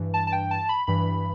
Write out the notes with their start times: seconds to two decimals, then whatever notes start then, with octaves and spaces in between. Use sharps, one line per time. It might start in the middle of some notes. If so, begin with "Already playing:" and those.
Already playing: G2 E3
0.14 A5
0.27 A5
0.32 G5
0.51 A5
0.69 B5
0.87 G2 E3 B5